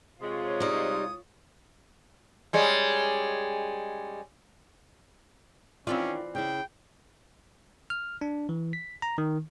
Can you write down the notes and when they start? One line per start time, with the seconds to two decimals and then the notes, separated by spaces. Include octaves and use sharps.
0.21 C3 G#3 F4 C#5
0.60 G3 D#4 D#6
2.53 G3 G#3 C#4
5.87 D#3 E3 C4 C#4 E4 F4 D5
6.35 C#3 E4 G5
7.90 F6
8.21 D4
8.49 E3
8.73 B6
9.02 A#5
9.18 D#3